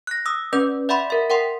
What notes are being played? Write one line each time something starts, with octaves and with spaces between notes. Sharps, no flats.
F#6 A#6
D#6 E6
C#4 B4 D5 G6
D5 E5 F#5 B5 C6
A#4 E5
A#4 F#5 G5 C6